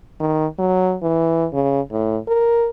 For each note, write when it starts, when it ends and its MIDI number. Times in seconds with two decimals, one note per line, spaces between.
0.20 0.47 51
0.59 0.96 54
1.02 1.47 52
1.53 1.81 49
1.92 2.18 45
2.28 2.69 70